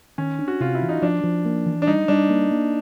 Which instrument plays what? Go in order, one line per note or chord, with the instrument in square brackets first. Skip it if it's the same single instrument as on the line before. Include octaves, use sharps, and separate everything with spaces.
[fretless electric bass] D#3 [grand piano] C#4
[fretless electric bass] D4
[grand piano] F#4
[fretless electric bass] C3 [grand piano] F4
[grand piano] E4
[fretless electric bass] E3
[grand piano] D#4
[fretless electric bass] F3 [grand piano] D4
[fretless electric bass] F3
A#3
E3
[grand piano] D4
[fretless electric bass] G3 [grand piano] D#4
[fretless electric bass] G3 [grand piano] D4
[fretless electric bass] A#3
A#3